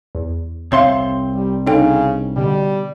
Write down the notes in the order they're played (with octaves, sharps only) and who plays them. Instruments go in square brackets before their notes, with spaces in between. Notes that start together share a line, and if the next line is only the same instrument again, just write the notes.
[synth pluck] E2
[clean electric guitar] C2 C4 C6 [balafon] C#5 E5 F5
[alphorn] G3
[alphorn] C#3 [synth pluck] D4 C#5 D#5 [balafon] D#4 A4 G5
[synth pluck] B2 D3 [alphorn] G3